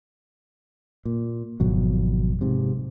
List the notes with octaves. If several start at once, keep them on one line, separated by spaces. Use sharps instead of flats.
A#2
G#1 F2 B2 F#3
G#2 C3